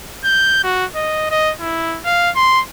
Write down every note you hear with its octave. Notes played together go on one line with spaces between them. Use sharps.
G6
F#4
D#5
D#5
E4
F5
C6